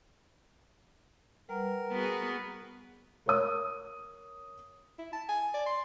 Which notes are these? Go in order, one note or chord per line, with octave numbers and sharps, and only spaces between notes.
G3 A#4 B4 F#5
B3 F#4 G#4
A#4 C#5 D#6
E4
A5
G#5
D5
C6